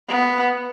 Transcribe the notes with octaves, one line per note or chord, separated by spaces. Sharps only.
B3